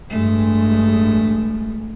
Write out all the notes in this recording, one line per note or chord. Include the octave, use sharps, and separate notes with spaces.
A1 G2 G#3 A3